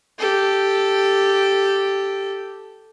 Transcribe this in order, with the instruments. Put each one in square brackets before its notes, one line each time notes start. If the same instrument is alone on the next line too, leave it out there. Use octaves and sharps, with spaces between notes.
[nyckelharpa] G4 A4